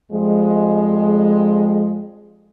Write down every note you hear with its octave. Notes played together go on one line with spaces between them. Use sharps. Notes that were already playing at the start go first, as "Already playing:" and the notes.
F2 F3 G3 G#3